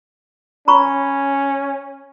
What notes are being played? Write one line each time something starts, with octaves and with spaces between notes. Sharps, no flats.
C#4 A#5 B5 C#6